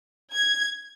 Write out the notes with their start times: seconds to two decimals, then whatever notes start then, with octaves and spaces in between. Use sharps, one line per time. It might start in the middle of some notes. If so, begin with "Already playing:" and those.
0.33 G#6